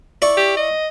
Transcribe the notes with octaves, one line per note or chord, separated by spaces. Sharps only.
E4 D5 C#6
G4
D#5